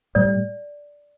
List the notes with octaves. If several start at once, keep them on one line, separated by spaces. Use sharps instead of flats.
A2 G3 D5